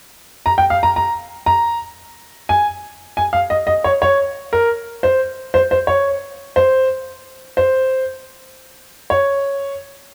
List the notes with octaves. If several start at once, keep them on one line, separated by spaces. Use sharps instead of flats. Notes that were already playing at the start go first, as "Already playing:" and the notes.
A#5
G5
F5
A#5
A#5
A#5
G#5
G#5
F5
D#5
D#5
C#5
C#5
A#4
C5
C5
C5
C#5
C5
C5
C#5